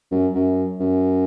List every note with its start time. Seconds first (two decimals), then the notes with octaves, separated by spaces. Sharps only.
0.11 F#2
0.34 F#2
0.80 F#2